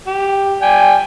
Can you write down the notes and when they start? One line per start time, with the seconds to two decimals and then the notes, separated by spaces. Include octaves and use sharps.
0.07 G4
0.62 D5 G5 G#5